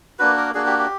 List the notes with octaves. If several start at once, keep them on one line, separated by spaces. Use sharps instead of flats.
A#3 D4 F#4 B4
A#4
A#3 D4 F#4 G#4
G4
G4